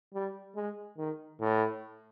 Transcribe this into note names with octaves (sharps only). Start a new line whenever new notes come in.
G3
G#3
D#3
A2